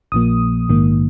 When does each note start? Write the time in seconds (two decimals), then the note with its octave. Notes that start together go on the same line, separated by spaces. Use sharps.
0.12 A#1 A#2 F3 A#3 D#6
0.69 A#1 G#2 D#3 A#3